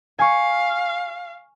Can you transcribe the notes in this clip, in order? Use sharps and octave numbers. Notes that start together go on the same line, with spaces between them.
F5 G#5 C#6